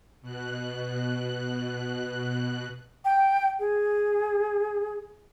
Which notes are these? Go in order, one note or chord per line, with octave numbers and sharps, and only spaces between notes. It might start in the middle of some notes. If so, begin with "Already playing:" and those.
B2 F#6
G5
G#4